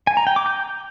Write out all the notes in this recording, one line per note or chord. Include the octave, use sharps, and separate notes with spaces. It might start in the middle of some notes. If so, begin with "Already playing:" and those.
G#5
A#5
G5
D6
G6